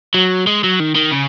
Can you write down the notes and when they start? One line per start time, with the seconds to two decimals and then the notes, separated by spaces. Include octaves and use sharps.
0.14 F#3
0.47 G#3
0.64 F#3
0.80 D#3
0.96 D#3
1.12 C#3